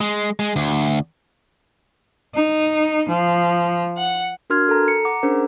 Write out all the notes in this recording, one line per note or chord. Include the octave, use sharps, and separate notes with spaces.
G#3
G#3
D2
D#4
F3
F#5
D4 F#4 A#4 C6 F6 G#6
A4 A#5
C#7
F#5 A#5 D6
C#4 D4 G#4 A#4 C5